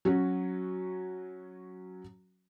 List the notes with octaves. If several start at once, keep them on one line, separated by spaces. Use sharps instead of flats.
F#3 C#4 F#4